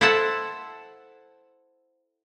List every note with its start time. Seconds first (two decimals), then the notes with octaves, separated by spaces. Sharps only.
0.01 E4 A4 C5 E5 F#5 A5